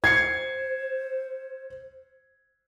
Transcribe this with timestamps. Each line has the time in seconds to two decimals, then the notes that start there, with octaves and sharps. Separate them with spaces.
0.04 C5 G#6 C7 C#7